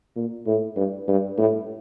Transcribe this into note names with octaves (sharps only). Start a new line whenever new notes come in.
A#2
A2
G2
G2
A2